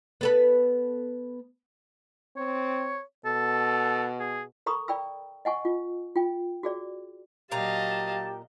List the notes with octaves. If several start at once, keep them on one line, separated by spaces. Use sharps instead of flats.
B3 A4 B4
C4 C#5
B2 A4
G#4
A4 A#4 A#5 B5 C#6 D#6
D5 G5 B5 E6
D#5 F#5 G#5 C#6
F4
F4 G5
F#4 G#4 D5
A#2 F#3 G4 D#5 F5 A5 A#5